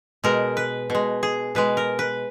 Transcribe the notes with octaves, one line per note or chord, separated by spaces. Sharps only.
B2 G#3 A#4
B4
B2 G#3
G#4
B2 G#3 B4
A#4
B4